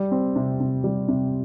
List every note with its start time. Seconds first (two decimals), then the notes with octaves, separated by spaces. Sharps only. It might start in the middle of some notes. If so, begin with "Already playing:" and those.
Already playing: G3
0.12 C4
0.36 C3
0.60 C3
0.84 G3
1.08 C3